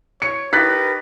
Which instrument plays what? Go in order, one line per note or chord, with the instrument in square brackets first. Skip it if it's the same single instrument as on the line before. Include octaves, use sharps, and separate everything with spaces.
[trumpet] C#5 [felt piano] C#7
[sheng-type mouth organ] D#4 G4 A#4 [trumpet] B4 [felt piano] F#6 A6 B6